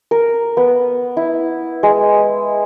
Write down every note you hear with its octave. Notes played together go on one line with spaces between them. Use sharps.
A#4
B3
E4
G#3